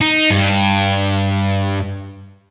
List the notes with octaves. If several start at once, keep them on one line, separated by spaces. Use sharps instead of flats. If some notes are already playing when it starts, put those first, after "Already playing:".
D#4
G2